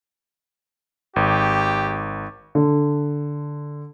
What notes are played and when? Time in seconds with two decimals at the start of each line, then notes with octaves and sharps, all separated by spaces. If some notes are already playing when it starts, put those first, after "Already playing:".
1.16 G#1 G4
2.55 D3